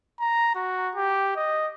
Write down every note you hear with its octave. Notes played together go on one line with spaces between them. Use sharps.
A#5
F#4
G4
D#5